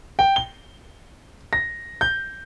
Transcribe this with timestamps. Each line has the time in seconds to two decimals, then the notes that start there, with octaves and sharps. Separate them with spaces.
0.19 G5
0.36 G7
1.53 A#6
2.01 G6